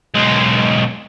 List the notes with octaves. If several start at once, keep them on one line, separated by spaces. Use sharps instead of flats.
B1 G#3